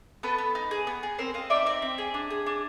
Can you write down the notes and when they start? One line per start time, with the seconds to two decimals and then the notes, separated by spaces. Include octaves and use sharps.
0.23 B3 A4 B4
0.38 B3
0.55 D#4
0.71 G#4
0.87 B3
1.03 G#4
1.19 C4 A#4 C5
1.34 C4 D#5 F5
1.50 D#4 D5 E5
1.66 C4 D5 E5
1.82 C4
1.98 G#4
2.14 D4
2.30 G#4
2.46 D4